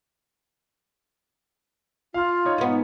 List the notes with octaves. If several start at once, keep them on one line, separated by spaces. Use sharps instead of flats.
F4 F5 F6
D#4 C#5
G#2 B3